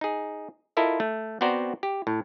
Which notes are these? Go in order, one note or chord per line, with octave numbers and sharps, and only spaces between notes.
D#4 G#4
E4 F4 A4 A#4 D#5
A3
B3 C4 F#4 C5 D5 A#5
G4
A2